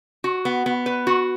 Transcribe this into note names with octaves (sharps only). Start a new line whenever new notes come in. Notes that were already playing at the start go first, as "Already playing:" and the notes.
F#4
B3
B3
B4
F#4